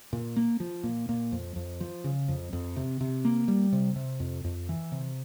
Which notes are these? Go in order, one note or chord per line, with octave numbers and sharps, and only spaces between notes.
A#2
A#3
F3
A#2
A#2
F2
F2
F3
C#3
F2
F2
C3
C3
A#3
G3
C3
C3
F2
F2
E3
C3